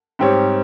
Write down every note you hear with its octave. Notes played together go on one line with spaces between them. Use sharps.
G#2 G3 C4 G4 C#5